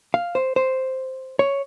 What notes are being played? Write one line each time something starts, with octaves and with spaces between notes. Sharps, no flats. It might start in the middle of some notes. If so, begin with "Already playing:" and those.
F5
C5
C5
C#5